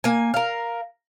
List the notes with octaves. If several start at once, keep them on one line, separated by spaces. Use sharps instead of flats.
A#3 G#5
A#4 F5